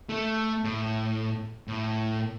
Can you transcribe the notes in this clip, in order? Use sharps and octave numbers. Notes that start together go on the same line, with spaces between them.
A3 A4
A2
A2